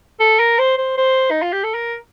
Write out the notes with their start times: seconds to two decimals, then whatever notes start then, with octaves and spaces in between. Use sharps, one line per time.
0.20 A4
0.39 A#4
0.59 C5
0.77 C5
0.97 C5
1.31 D#4
1.42 F4
1.52 G4
1.63 A4
1.74 A#4